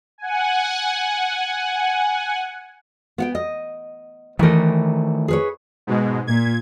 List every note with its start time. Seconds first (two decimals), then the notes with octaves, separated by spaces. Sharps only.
0.18 F#5 G#5
3.18 B3 F#5 G5
3.35 D#5
4.39 D#3 E3 A3 A#4
5.28 G#4 B4 C#5
5.87 G#2 B2 G#3
6.27 A#2 G#6